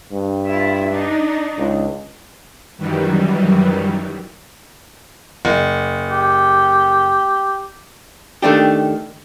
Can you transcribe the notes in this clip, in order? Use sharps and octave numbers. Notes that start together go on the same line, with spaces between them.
G2
E4 F4 E5
D4 D#4
C#2
F#2 D#3 E3 F#3 G3
F#1
G4
D#3 A3 D4 G4